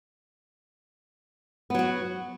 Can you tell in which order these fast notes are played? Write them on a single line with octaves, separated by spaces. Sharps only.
B3 F#3 F#4